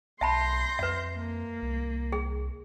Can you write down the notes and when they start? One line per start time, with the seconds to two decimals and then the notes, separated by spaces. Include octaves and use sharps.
0.21 B1 E5 A5 B5 C6 G6 A#6
0.79 F2 B4 E5
1.16 A#3
1.62 C2
2.12 G#4